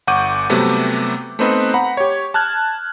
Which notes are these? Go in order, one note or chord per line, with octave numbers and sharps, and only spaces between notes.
G1 F#5 C#6 D6 G6 D#7
C3 F#3 G3 A3 B3
A3 B3 C4 D#4 B4
F#5 A#5 B5
G4 C#5
A5 F6 F#6 G#6